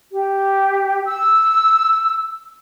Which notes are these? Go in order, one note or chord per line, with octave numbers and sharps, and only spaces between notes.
G4
E6